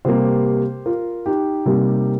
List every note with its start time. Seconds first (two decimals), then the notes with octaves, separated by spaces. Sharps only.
0.05 C3 G3 A#3 G4 C5
0.86 F4 A#4
1.26 D#4 G4
1.66 C3 G3 A#3